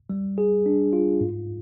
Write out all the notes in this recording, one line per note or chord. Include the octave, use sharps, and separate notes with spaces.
G3
G#4
D4
F4
G#2